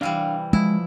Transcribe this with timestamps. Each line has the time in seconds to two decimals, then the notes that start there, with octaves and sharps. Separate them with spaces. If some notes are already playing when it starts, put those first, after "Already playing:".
0.01 C3 E3 G3 D4 F5
0.53 F3 G#3 E4